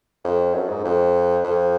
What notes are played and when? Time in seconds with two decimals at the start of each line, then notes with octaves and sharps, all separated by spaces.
0.25 F2
0.54 F#2
0.69 G#2
0.84 F2
1.44 F2